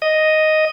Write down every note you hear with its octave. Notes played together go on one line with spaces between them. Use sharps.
D#5